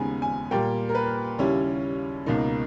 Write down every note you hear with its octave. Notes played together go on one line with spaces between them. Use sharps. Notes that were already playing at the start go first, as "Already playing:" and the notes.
Already playing: D#2 C#3 G#3 B3 D#4 G#5
G#5
A#2 G3 A#3 G5
A#4
B4
D#2 C#3 G3 C#4 E4 C#5
C#2 B2 A#3 D#4